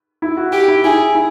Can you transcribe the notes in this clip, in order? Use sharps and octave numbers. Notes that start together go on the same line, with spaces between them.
E4
F#4
G4
E4
E4 G#4
E4